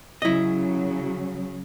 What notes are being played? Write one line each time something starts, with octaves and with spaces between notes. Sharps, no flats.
C#3 F#3 E4 D#5